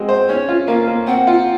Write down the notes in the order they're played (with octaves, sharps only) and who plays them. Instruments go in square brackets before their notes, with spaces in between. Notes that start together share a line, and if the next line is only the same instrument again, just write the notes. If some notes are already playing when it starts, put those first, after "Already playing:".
Already playing: [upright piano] G#3 C4 F#4
C5
[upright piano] C#4 [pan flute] C#5
[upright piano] F4
[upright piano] A#3 [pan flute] F5
[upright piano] A#3
[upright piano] C4 [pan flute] F#5
[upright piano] F4